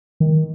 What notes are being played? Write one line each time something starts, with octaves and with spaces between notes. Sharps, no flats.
D#3